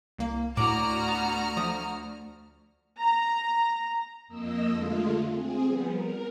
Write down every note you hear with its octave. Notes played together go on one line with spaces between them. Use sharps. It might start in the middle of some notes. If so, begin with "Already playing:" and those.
C2 A#3
D2 A2 F#4 D5 A#5 F6
B3
F3 A3 D#6
A#5
F2 A#3 D#5 E6
D3 G#3 A3 F4
C4 G#4
F3 G3 B3
A#4